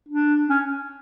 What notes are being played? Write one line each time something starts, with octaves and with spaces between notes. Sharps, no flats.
D4
C#4